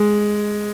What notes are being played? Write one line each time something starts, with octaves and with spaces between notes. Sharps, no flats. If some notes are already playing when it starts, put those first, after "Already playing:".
Already playing: G#3